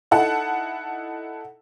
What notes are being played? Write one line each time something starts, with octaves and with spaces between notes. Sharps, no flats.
D#4 E4 A4 F#5 A5